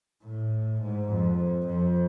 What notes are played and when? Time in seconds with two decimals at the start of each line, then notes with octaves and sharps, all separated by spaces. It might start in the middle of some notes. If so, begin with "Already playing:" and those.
0.24 A2
0.81 G#2
1.10 F2
1.67 F2